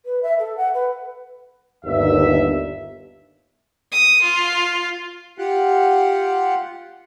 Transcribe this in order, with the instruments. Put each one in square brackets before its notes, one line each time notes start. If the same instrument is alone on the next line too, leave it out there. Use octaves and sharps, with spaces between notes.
[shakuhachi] B4
E5
A4
F#5
B4
[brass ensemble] G1 D#2 E5
[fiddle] D#6
F4
[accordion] F4 G4 F#5